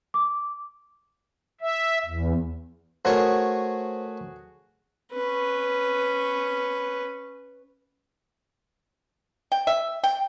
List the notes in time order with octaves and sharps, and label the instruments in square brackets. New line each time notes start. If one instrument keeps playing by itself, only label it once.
[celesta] D6
[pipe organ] E5
E2
[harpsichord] A3 A#4 C#5 [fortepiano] F#4 G#4 [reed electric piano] C5
[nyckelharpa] C#4 B4
[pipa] G5
E5
G5